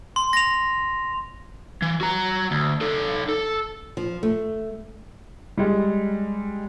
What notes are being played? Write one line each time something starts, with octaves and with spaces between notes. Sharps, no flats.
C6
A#6 F7
E3
F#4 A#5
D2
D#4 A4
A4
F3
A3
G3 G#3